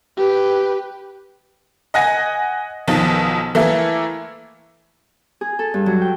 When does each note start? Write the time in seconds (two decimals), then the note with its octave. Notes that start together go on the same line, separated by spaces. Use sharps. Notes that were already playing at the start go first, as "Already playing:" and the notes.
0.17 G4 B4
1.94 D#5 F#5 G#5 A#6
2.88 B1 B2 D#3 F3
3.55 E3 A3 A#3 E4
5.41 G#4
5.59 A4
5.74 G2
5.86 F#3
6.02 G5